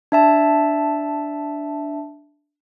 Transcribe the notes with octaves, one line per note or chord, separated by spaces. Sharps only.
D4 E5 A5